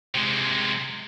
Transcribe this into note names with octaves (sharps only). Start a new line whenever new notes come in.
C3 G#3